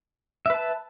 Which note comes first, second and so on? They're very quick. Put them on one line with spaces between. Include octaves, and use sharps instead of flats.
E5 B4 A5